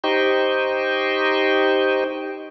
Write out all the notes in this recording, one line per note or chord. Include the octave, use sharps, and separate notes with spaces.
D#4 G4 C5 D#5 G5 C#6